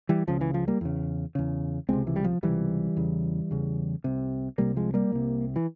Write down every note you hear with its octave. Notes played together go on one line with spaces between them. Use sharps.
E3 G3
C#2 C#3 F3
E3
F3
G3 A#3
E2 C#3
E2 C#3
C#2 C3 G#3 C4
E3
G3
F3
C#2 C3 E3 G3
E2 C#3
E2 C#3
C2 C3
C2 C3 G3 A#3
F3 G#3
G3 A#3
C2 C3
E3